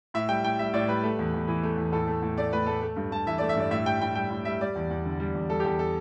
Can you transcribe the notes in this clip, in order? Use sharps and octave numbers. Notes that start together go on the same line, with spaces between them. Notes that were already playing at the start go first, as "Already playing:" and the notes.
A2 E5
G3 G5
A2 G5
G3 E5
A2 D5
G3 B4
A3
E2
E2
E3
A3
E2
A2 A4
A3
A2
A3 D5
A2 B4
A3 A4
A3
G2
G2 A5
E3 E5
A3 D5
E5
G2 D5
A2 E5
G3 G5
A2 G5
G3 G5
A2
G3 E5
G3 D5
E2
E2
D3
G3
E2
G3 A4
G4
E2 A4
A4